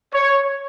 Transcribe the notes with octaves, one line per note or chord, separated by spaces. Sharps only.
C#5